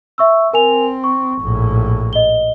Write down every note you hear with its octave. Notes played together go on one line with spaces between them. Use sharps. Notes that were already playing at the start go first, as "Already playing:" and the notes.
E5 C#6 E6
C4 A#4 G#5 F7
C#6
A#1 A2
D#5 G7